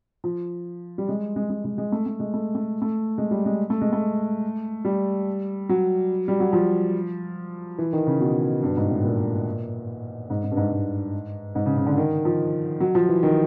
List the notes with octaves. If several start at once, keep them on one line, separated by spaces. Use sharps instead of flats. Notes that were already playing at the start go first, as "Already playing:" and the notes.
F3
G3
G#3
G#3
G#3
G#3
G#3
A3
A3
G#3
A3
A3
A3
G#3
G3
G#3
A3
G#3
A3
G3
F#3
G3
F#3
F3
E3
D#3
C#3
B2
G2
G#2
A2
A#2
G#2
G#2
G2
G#2
G#2
G#2
C#3
C#3
D3
D#3
F3
F#3
F3
E3
D#3